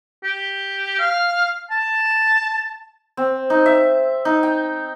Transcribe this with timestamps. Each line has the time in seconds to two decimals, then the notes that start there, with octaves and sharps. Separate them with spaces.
0.24 G4
0.99 F5
1.71 A5
3.17 C4
3.50 D#4
3.66 E5
4.25 D#4
4.43 G5